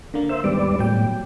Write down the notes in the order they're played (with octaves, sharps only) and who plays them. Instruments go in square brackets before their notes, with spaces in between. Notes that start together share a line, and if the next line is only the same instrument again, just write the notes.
[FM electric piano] D3 A#3
[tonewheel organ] C5 E5
[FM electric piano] D#2 G#2 [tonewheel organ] G3 B3 D5
[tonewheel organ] A2 [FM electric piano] F#3 G5